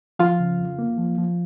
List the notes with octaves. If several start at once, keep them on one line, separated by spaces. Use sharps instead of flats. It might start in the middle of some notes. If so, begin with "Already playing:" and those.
F3 F4 F5
C#3
F2
A#3
F3
F3